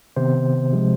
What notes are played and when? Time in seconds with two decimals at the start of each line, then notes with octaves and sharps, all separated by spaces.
0.17 C3 D#3 B3 C5
0.72 C3 F3 G#3